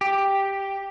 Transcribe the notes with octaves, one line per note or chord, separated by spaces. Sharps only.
G4